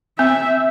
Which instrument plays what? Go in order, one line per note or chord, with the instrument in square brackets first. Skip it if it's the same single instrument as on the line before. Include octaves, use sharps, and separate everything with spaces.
[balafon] C4 [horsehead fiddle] E5